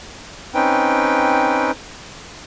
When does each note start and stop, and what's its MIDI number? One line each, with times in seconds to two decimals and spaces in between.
0.54 1.71 60
0.54 1.71 61
0.54 1.71 63
0.54 1.71 71
0.54 1.71 79